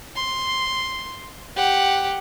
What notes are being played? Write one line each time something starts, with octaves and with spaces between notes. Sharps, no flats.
C6
G4 F#5